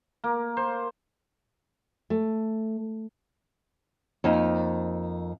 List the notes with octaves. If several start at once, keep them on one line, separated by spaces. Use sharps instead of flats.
A#3
C5
A3
F2 A#3 D#4